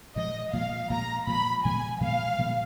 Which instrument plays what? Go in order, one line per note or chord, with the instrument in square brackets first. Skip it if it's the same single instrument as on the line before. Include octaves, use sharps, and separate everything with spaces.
[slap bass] A#2 F3 G#3 [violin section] D#5
[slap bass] A#2 F3 G#3 [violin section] F5
[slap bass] A#2 F3 G#3 [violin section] A#5
[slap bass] A#2 F3 G#3 [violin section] B5
[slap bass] A#2 F3 G#3 B3 [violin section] G#5
[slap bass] A#2 F3 G#3 B3 [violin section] F5
[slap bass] A#2 F3 G#3 B3